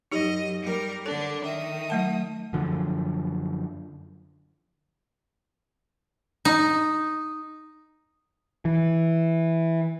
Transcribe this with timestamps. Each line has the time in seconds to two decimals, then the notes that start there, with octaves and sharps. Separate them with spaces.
0.12 F#2 D#4 G4 D#5
0.62 G3 A#4
1.06 D3 D4 A4
1.44 D#3 E5 D#6
1.90 F#3 A3 A5
2.53 F#2 D3 F3
6.45 D#4
8.65 E3